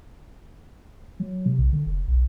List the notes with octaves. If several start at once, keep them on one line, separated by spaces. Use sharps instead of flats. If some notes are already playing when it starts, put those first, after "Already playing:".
F#3
C3
B1
D3
F1
B1